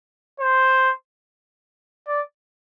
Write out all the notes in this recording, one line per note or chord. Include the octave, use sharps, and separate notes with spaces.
C5
D5